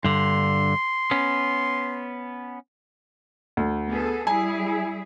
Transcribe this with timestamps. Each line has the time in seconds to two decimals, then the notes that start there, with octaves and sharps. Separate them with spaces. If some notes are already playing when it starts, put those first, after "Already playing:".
0.04 G2 D3 C6
1.11 B3 C#4
3.57 D2
3.87 B3 G#4 A4
4.27 G3 E4 G#4 G#5